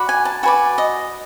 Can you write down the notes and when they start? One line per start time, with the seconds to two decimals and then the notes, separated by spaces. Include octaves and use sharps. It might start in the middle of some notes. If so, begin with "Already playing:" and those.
Already playing: F#4 B4 D5
0.09 G#5
0.25 A5
0.43 F#4 B4 D5 G#5
0.78 D#5